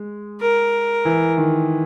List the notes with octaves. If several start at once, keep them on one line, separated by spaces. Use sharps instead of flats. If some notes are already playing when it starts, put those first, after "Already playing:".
Already playing: G#3
A#4
E3
D#3